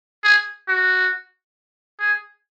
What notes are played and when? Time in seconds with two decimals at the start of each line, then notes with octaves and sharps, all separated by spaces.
0.24 G#4
0.68 F#4
1.99 G#4